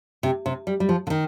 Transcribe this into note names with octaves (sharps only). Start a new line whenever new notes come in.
C3
C3
G3
G3
F3
D3
D#3